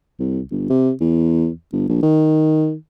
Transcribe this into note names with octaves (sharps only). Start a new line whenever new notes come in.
C2
G1
C3
E2
G1
A#1
D#3